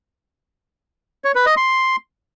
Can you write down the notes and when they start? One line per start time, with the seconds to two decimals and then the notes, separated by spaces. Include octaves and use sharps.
1.24 C#5
1.35 B4
1.46 D#5
1.57 C6